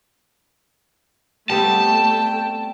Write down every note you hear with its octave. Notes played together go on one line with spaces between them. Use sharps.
G3 A3 B3 C4 G5 A5